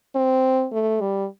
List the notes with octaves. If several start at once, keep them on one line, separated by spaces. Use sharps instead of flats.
C4
A3
G3